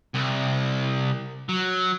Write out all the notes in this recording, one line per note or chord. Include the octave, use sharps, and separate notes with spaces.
C2
F#3